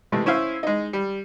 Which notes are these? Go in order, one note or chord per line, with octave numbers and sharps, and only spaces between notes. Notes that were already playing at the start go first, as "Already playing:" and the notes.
C3 E3 G#3 A3
C#4 E4 C5 E5 F5
G#3 D#4
G3